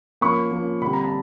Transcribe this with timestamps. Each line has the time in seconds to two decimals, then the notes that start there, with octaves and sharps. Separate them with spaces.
0.21 F3 A#3 C#4 B5 C#6
0.51 F3 A#3 C#4
0.82 D3 G3 C4 B5
0.93 A#5
1.04 A5 B5